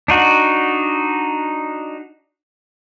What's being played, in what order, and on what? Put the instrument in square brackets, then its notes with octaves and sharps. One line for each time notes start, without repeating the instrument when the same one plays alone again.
[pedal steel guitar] D4 D#4 F#4